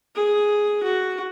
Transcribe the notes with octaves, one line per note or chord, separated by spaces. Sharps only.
G#4
F#4